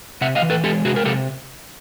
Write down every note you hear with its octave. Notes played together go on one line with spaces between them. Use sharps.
C3 E5 F#5
D#5 F5
E3
A4 B4
G#3 G4 A4
C3 F#4 G#4
A#4
C3 G4 A4